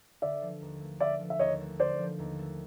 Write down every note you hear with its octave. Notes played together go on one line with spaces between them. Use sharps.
D3 D5 E5
F3
D#2
A3
D3 D5 E5
F3
E5
D#2 C#5 D#5
A3
D3 C5 D5
F3
D#2
A3